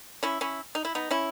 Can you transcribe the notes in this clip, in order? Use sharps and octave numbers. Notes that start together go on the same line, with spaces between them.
C#4 E4
C#4 E4
D#4
E4
B3 D#4
C#4 E4